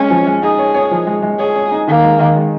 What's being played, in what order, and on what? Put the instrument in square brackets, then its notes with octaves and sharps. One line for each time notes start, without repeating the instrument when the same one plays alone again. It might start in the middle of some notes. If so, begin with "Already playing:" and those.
Already playing: [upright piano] G#3 [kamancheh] C#4
[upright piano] F3
G#3
[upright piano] D#4 [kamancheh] G#4
[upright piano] C#5
C#5
F3
G#3
G#3
[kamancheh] G#4 [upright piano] C#5
[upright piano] C#5
D#4
[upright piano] D#3 [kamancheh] A#3
[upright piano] G#3
D#3
G#3